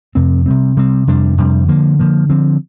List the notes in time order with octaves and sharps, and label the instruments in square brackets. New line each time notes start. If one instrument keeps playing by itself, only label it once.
[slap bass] F2 C3 F3 C4
C3 G3 C4
C3 G3 C4
F2 C3 G3 D4
F2 C3 G3 D4
D3 F3 A#3
D3 F3 A#3
D3 F3 C4